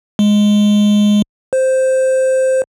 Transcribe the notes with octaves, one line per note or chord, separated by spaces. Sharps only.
G#3
C5